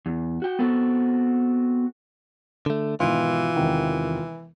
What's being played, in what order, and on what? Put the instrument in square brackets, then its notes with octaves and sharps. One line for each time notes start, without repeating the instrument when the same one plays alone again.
[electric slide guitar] E2
F#4 G5
B3 C4 F#4 A4
[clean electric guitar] D3 A3
[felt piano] G#1 B2 D#3 [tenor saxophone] E3 [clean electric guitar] F4
[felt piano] E1 C3 D#3